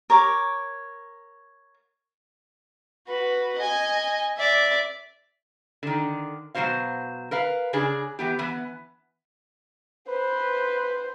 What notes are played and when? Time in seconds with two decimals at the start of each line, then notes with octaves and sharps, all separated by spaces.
0.10 A#4 C#5 D6
3.08 F#4 B4
3.58 D#5 G#5
4.37 D5 E5
5.83 D3 D#3
6.55 B2 F#3 G#3 F#4 C5 F5
7.31 A#4 B4 F5
7.73 C#3 D4 G#4
8.19 E3 B3 G4
8.39 E3 B3
10.09 B4 C5